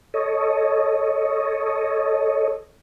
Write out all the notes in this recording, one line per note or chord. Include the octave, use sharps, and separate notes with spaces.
A4 C#5 D#5